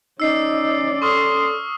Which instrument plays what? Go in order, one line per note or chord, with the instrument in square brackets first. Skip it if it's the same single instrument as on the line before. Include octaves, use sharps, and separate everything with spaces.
[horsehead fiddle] C#4 D5 [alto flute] D#4 [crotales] E6 C7
[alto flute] A4 [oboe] C6 [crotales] C#6 D#6 F6